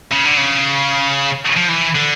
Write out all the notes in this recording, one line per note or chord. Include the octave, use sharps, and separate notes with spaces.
C#3
D3
C#3
F3
E3
D3